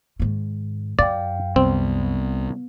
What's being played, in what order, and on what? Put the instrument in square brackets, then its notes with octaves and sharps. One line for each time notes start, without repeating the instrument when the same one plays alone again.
[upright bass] G#2 D#3
[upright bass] F#2 [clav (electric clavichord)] D5 [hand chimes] F5 G5
[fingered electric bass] C2 [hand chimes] B3 [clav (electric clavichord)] C4